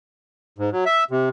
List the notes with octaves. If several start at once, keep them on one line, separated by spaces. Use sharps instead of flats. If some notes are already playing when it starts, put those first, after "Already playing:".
G#2
F#3
E5
C3